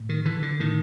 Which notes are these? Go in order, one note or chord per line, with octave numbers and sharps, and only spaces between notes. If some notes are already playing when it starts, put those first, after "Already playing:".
Already playing: A2
D#3
D3 E3
D3
A2 D#3